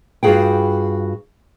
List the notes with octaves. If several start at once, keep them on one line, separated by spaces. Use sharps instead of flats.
G2 F4 F#4 G#4 F#5 G5